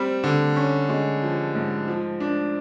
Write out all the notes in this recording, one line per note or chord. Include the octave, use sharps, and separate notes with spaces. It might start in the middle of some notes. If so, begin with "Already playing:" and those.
Already playing: G3 C4
D3
C#4
G#3
F3
G#2
F3
D4